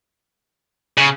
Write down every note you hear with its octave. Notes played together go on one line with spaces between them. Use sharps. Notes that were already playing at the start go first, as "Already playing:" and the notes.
C#3